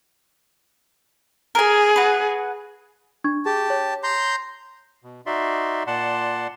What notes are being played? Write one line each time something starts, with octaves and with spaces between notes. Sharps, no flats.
G#4 A#4 G#5
F#4 B4
D4 C#6 G#6
G4 G#4 A5
C#5
A#5 C6 G6
B2
D#4 F#4 D5 E5 C6
A#2 D5 F#5 A5 C6